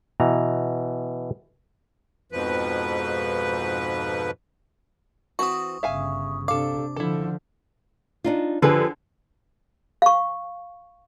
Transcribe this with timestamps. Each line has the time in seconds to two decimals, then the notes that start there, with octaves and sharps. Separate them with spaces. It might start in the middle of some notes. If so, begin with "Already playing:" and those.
0.20 B2 E3 A#5
2.32 F2 G#2 B2 F3 B4
5.39 E3 C4 F#4 C#6 D#6
5.83 G1 C#3 E5 F5 G#5
6.48 C3 D4 A4 F5 D6
6.96 D3 F3 E4 A4
8.24 D4 D#4 F4
8.62 D3 F3 G4 G#4 B4
10.02 F5 C#6